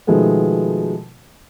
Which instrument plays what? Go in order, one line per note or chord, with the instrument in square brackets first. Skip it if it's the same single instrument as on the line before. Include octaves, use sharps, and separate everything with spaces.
[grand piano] B2 D#3 F3 G#3 A3 B3